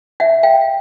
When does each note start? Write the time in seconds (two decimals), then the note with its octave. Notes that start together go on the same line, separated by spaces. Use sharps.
0.20 E5 F#5
0.43 F5 G5